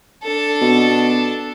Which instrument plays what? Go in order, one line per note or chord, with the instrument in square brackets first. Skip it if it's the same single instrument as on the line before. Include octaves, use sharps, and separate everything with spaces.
[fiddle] D4 A4
[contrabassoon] B2